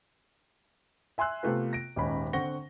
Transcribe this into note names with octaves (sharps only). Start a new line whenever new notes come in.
E5 G#5 C6 E6 F#6
C3 A3 B3 F4 B4
A#6 D7
D#1 G#2 C#4 D#4 B5
D3 C4 F#5 C#6 A#6 G7